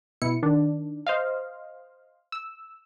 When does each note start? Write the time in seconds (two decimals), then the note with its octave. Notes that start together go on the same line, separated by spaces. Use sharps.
0.22 B2 E4 C#7
0.43 D#3 D4
1.07 C5 D#5 F5
2.32 E6